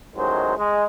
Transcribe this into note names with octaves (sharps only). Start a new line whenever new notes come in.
A1 D#3 F#3 G#3 C5
G#3